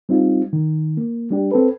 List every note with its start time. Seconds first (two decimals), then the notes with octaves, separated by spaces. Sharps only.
0.09 G3 C4 D#4 F4
0.53 D#3
0.97 A#3
1.31 G3 D4 G4
1.51 C4 A4 B4